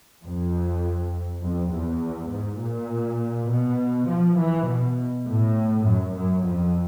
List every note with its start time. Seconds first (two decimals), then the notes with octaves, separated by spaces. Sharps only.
0.23 F2
1.42 F2
1.71 E2
2.31 G#2
2.60 A#2
3.49 B2
4.08 F3
4.38 E3
4.67 B2
5.26 A2
5.86 F#2
6.15 F#2
6.45 F2